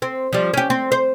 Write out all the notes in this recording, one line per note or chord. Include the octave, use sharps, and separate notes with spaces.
C4
F3 G3
C#4 G4
C4
C5